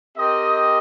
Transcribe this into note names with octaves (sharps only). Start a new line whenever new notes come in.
C4 G4 A#4 D#5